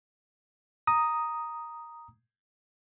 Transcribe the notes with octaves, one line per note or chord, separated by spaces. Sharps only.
A#5 D#6